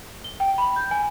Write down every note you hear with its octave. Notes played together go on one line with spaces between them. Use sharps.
G7
G5
B5
G6
G#5